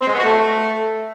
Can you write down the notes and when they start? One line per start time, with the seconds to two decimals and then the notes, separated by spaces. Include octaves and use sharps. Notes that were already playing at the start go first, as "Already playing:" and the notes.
0.02 C4
0.07 G#3
0.13 B3
0.19 F#4
0.24 A3